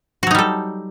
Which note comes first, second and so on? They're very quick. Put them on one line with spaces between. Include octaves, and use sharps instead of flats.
F#4 F#3 D#4 G3 A4